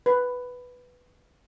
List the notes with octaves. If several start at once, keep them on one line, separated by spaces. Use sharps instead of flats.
B4